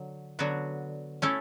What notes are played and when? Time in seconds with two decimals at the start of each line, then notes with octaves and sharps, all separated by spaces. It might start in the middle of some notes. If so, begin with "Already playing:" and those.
Already playing: D3 F#3
0.39 D3 F#3 B3 F#4
1.22 A3 C#4 E4 A4